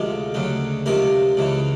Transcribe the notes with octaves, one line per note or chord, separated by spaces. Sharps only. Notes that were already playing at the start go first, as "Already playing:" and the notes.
Already playing: D2 C3 F3 G#3 A#4
D2 C#3 F#3
C#2 C3 F3 A#4
C#2 C#3 E3